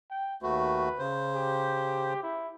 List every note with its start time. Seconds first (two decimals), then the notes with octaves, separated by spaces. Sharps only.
0.10 G5
0.43 D#2 A3 F#4 B4
0.99 C#3 C5
1.35 G4
2.23 E4